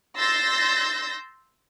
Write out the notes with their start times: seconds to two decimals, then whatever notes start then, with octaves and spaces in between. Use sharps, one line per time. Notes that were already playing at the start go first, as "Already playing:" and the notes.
0.18 C6 E6 G6 A6 A#6